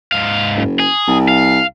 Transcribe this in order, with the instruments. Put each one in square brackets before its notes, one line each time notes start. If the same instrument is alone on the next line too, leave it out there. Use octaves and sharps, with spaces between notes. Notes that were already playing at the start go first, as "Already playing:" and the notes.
[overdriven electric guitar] G#2 F5
[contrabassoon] F#1
[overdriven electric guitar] G#4
[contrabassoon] C2
[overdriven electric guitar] F5